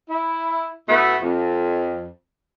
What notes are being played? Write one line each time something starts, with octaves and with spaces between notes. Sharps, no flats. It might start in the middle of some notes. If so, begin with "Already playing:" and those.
E4
B2 A3 B3 E4
F2